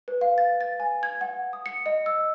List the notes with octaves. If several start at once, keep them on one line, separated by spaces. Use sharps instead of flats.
B4
F5
A6
A6
G#5
G#6
F#5
D#6
C#7
D#5
E6